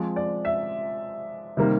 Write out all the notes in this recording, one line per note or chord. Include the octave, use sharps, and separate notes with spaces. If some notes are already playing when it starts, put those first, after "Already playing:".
Already playing: F3 G#3 C4
D5
E5
C3 D#3 G3 A#3